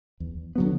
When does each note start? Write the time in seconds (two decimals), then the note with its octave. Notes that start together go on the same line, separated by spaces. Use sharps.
0.20 E2
0.56 D3 F#3 B3